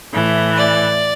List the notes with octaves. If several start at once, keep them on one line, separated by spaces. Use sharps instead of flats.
A2 E3
D5